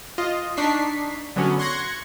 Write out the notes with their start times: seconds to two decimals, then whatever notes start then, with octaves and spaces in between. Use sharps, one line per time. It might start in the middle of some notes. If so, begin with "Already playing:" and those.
0.18 F4 D#5
0.57 D4 D#4 C#6 B6 C7
1.36 D3 F#3 B3 C#4 F#4
1.59 C6 C#6 F#6 G#6 A#6 C#7